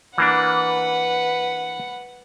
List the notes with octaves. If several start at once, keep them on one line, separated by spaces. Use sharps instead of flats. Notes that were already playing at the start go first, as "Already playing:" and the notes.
E3 A#3 D4 B4 F#5